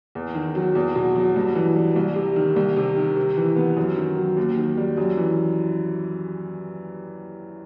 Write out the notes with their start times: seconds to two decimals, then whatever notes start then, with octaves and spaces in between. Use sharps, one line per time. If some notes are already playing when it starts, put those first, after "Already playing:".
0.15 E2
0.35 D#3
0.55 F#3
0.75 E2
0.96 B2
1.16 F#3
1.36 G2
1.55 E3
1.76 G3
1.96 C2
2.16 C3
2.36 D#3
2.56 C2
2.76 C3
2.96 D#3
3.16 C3
3.36 E3
3.56 B3
3.77 F#2
3.96 D#3
4.17 F#3
4.37 D#2
4.57 D#3
4.77 G3
4.97 F#2
5.17 E3